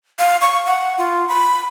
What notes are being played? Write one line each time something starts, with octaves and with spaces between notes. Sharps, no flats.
F5
C#6
F#5
F4
B5